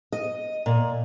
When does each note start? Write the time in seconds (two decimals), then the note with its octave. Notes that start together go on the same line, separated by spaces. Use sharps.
0.12 D#5
0.66 A#2